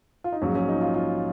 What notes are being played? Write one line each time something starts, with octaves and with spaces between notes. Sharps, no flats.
F4
D#4
A#1 G#2 F#3 C#4
C#4
D#4
F4
F4